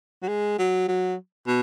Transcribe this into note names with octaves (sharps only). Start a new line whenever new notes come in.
F#3
G#3
F#3
F#3
B2